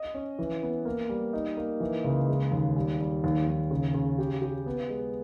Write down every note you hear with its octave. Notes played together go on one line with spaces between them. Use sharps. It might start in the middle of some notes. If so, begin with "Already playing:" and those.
Already playing: D#5
C#4
E3
B3
A#3
G3
D#4
A#3
E3
C#2
G#3
D#2
G3
G3
D#2
D#2
C#3
C#3
G4
G4
B3
G#3